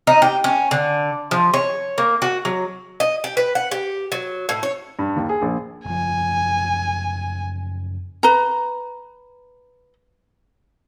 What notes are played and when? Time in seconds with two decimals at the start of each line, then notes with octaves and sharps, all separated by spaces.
0.07 D#4
0.22 G4
0.44 C#4
0.71 D3
1.31 F3
1.54 C#5
1.98 A#3
2.22 F#4
2.45 F#3
3.00 D#5
3.24 G4
3.37 B4
3.55 F#5
3.71 G4
4.12 F#3
4.49 A2
4.63 C#5
4.99 G2
5.16 D#2
5.29 G#4
5.42 A#1
5.86 F#1 F3 G#5
8.23 B4 A#5